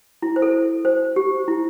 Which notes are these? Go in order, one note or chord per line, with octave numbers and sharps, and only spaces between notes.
E4
C5
A4
C5
G4
E4